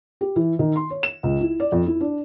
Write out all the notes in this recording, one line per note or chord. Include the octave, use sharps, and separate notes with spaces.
G4
E3
D#3
C6
C#5
E7
C#2
E4
D5
F2
E4
D4